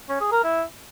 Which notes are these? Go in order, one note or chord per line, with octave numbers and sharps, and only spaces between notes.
C#4
G#4
A#4
E4